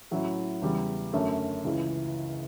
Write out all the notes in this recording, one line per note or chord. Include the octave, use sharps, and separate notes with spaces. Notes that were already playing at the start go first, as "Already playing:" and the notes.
A2 F#3 C#4 E4
E2 C#3 G3
F#2 D3 A3 C#4
C#2 C#3 E3